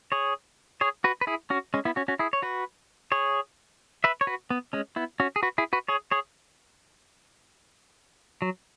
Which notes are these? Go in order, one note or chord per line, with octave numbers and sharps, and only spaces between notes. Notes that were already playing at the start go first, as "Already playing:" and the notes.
G#4 C#5
G#4 C#5
F#4 B4
B4
E4 G#4
C#4 F#4
G#3 C#4
B3 E4
C#4 F#4
C#4 F#4
E4 G#4
C#5
F#4 B4
G#4 C#5
B4 E5
C#5
F#4 B4
B3
G#3 C#4
B3 E4
C#4 F#4
G#4
F#4 B4
E4 G#4
F#4 B4
G#4 C#5
G#4 C#5
F#3